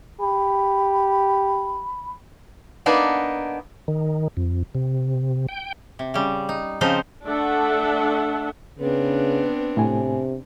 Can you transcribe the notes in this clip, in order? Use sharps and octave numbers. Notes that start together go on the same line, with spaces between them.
G4 B5
A#3 B3 D4 D#4
D#3
F2
C3
G5
C3
C#3 G3
D#4
C#3 F3 C4 D#4 C5
A3 D4 A4 E5 F#5
C#3 B3 C4 D4 B4
A2 C3 G#5